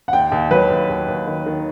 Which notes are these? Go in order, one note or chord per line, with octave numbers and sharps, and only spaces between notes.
F#5
D#2 G5
D#2
F#3 B4
D#2
D#2
D#2
D#3
D#3